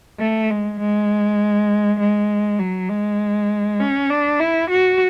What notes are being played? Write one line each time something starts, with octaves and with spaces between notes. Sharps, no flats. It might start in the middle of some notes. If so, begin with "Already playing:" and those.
A3
G#3
G#3
G#3
F#3
G#3
C#4
D4
E4
F#4